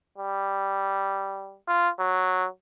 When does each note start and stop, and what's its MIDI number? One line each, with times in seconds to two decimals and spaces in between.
0.18 1.56 55
1.68 1.89 65
2.00 2.47 54